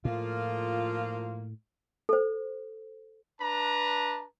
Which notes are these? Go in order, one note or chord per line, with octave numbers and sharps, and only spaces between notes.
A2 F3 A#3 F4
A4 C5
D4 B4 A5 A#5